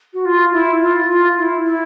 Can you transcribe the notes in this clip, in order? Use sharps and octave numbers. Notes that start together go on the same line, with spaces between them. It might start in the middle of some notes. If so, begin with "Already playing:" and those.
F#4
F4
E4
F4
F4
E4
E4